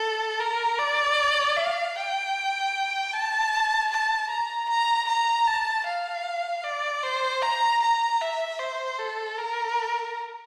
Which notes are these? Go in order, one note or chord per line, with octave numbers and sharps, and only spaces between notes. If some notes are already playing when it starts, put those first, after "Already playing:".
Already playing: A4
A#4
D5
F5
G5
A5
A5
A#5
A#5
A#5
A5
F5
D5
C5
A#5
A#5
E5
C5
A4
A#4